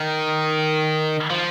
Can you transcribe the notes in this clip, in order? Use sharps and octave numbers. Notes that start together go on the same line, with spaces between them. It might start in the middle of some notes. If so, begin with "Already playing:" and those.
Already playing: D#3
F3